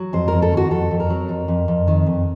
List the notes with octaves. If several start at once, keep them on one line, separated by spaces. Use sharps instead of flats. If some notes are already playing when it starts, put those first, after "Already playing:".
Already playing: F#3
F2 C5
F2 A#4
A4
D#3 F#4
F2 A4
F2
A#4
F#3
F2
F2
F2
D#3
F2